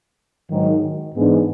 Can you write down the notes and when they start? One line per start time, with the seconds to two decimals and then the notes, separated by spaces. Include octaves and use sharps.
0.49 G#2 D#3 F#3
1.14 G#2 E3 G#3 B3 D4